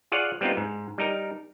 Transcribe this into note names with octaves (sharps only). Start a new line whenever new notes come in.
F4 G#4 C#5 D5 F5 F#5
G3 B3 C4 D#4 F4
G#2
G3 D#4 A#4